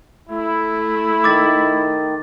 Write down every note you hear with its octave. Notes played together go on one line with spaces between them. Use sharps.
A3 E4
D#3 D6 A6